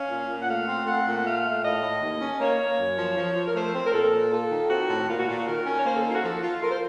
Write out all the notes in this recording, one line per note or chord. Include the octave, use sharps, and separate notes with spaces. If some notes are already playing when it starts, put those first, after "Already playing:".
Already playing: C#4 F5
A#2
A#2
F#5
A3 F5
C4
A3 F#5
A#2
F#5
A3 F5
A3
A2 D#5
A2
D#2
C#4
A#3 C#5
A#3
F#2
F3
F3
F3
A#4
A3 C5
C4
A#4
A#2 A4
A#2
F4 A4
D#3
C4 F#4
A2
A#2 F4
F#4
A#2 F4
F#4
D#3 A#4
C#4
C#5
A#3 C5
A4
D#4 A4
F4
F#4
F3 A4
F4
F4 A#4
C5